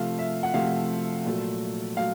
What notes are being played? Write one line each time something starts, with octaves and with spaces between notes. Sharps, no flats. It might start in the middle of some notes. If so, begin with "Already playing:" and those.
Already playing: C3 F3 A3 F5
E5
F#5
C3 F3 A3 F5
A#2 F#3 A3
F#3 A3 F5